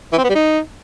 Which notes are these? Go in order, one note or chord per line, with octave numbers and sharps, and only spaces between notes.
E3
C4
B3
G3
D#4